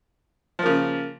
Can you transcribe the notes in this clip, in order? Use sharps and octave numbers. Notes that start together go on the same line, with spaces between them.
C#3 F3 A#3